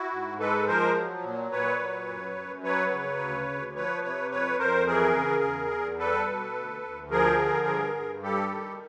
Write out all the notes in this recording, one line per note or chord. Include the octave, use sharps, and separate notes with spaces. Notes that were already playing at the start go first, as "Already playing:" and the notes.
Already playing: E4 F#4
G#2
G#3 A4 B4
F3 A#4 C5
F#3
A#2
A#2 B4 C#5
F#3
F#2
F#2
F#3 B4 C#5
C#3
D2
D2
F3 B4 C#5
C3 B4 C#5
F2 B4 C#5
F2 A#4 C5
E3 G#4 A#4
C#3
E2
E2
G3 A4 B4
B2
D2
D2
F3 G#4 A#4
D3
G2
G2
G3 G4 A4
D#3